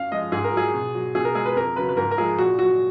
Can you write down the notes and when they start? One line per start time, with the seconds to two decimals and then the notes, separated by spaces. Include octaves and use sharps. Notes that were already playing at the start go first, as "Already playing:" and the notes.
Already playing: F#2 F5
0.11 F3 G#3 D#5
0.32 G#2 G#4
0.44 A#4
0.52 F#3 G#4
0.74 B2
0.95 F#3
1.15 B2 G#4
1.25 A#4
1.35 G#3 G#4
1.46 B4
1.56 F2 A#4
1.76 C#3 F#3 B4
1.89 B4
1.97 G#2 A#4
2.11 A#4
2.17 F3 G#3 G#4
2.39 A#2 F#4
2.59 F#3 F#4